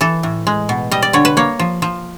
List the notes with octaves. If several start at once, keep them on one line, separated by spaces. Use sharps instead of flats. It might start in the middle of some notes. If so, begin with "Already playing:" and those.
E3 A4
A2
G#3
B2
G3 D#5
D5
D3 C#5
B4
A#3 C#5
F3
F3